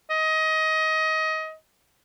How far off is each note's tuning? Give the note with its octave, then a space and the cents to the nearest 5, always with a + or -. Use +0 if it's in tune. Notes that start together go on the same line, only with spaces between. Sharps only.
D#5 +20